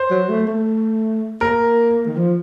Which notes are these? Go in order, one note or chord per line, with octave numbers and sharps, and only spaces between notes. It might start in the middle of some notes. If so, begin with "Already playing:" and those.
Already playing: C5
F#3
A3
A3
A#3 A#4
D#3
F3